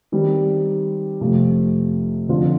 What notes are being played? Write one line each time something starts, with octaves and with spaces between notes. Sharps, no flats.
D#3 G3 C4
F2 C3 F3 A3
F2 D3 F3 C4 F4